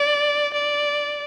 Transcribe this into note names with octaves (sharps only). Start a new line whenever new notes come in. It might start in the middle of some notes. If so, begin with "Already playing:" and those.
Already playing: D5
D5